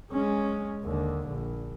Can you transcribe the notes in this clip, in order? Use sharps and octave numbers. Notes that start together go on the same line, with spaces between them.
G#3 C#4
D#2 D3
A#1